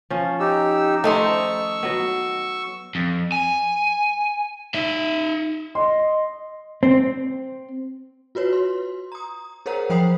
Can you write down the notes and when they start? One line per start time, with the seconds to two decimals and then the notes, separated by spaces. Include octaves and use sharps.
0.10 F3 C#4
0.40 D#4 G4 E6
1.04 D#3 A3 D#4 C5 C#6 E6
1.83 F#3 B3
2.95 F2
3.32 G#5
4.74 D#4 E5
5.75 D#5 C6
6.83 C4
8.35 F4 F#4 B4 C#5
8.53 C6
9.12 A#5 D#6
9.66 G#4 A#4 C5 C#5 F#5 A#5
9.90 F3 C5 G5 B5 D#6 C7